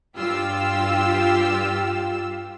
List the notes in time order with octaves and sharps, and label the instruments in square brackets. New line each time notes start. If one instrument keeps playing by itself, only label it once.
[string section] G2 F4 G4 E6